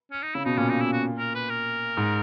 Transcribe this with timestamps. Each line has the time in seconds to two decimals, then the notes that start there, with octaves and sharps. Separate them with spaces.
0.11 C#4
0.23 D#4
0.35 C#3 E4
0.45 B2 D#4
0.57 A#2 C#4
0.70 D#4
0.81 E4
0.93 F#4
1.19 A#4
1.35 B4
1.50 A#4
1.97 G#2